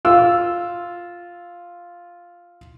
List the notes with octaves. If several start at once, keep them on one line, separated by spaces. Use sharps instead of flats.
F4 E6